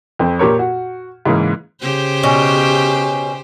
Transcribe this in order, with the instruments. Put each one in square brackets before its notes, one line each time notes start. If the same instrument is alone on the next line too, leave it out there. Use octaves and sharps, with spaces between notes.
[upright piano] F2 C4
A#2 G4 A#4 C#5
F#4
G#2 C#3 E3 A#3 D#4
[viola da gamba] C#3 G4 C5
[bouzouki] B2 C#4